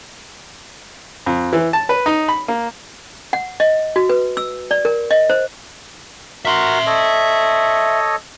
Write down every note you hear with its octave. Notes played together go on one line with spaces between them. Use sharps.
F2
E3
A5
B4
D#4
B5
A#3
F#5
D#5
F#4
B4
E6
D5
A#4
D#5
C5
F#4 A#4 E5 C6
A4 C#5 D#5